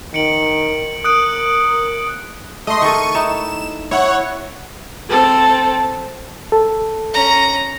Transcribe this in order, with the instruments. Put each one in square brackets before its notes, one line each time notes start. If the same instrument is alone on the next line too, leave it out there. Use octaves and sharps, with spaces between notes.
[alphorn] D#3 [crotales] C#7 D7 F#7
[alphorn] A#4 [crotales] D#6 F#6 D7
[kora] A3 [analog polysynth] D#5 C6
[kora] D#3 A4 [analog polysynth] C#6 D#7
[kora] D#4 E4 [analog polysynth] E7
[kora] E4 [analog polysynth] C#5 F#5
[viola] C4 A4
[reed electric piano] A4
[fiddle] C#4 A#5